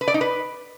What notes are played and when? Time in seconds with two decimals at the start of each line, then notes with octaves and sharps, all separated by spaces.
0.01 B4
0.08 D5
0.14 D#4
0.21 B4